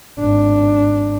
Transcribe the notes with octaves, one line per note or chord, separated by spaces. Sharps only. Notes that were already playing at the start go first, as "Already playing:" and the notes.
G#1 D4